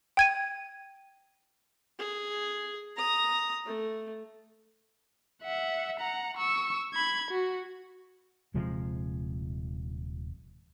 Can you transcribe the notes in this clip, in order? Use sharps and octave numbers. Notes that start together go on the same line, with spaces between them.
G5 G#6 D#7
G#4
A#5 D#6
A3
E5 F#5
F#5 A#5
C#6 E6
B5 G#6
F#4
D#1 C3 F3 G#3